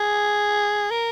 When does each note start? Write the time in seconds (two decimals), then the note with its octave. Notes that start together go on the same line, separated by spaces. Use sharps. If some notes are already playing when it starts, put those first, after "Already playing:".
Already playing: G#4
0.90 A#4